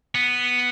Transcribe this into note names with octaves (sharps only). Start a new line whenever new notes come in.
B3